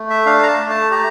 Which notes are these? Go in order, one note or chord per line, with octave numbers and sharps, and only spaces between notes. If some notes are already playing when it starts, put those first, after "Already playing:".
Already playing: A3
E5
D4 F5
A#5
A5
A3
A5
G4 A#5